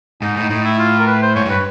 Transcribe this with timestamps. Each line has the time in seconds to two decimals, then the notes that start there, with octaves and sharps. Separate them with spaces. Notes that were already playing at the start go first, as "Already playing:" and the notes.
0.22 G#2 D#4
0.36 A2 D#4
0.50 A2 D#4
0.65 E4
0.79 F4
0.99 A#4
1.07 B4
1.22 C5
1.35 G#2 C#5
1.46 G2
1.50 B4